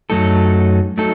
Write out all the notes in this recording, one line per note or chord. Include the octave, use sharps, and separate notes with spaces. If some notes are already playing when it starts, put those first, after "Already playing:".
F#2 F#3 A3 D#4 A4
F#3 A3 D#4 A4